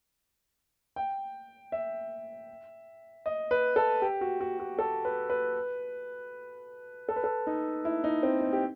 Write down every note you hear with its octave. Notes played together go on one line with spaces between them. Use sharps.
G5
E5
D#5
B4
A4
G4
F#4
F#4
F#4
A4
B4
B4
A4
B4
A4
D#4
E4
D#4
C4
D#4
G4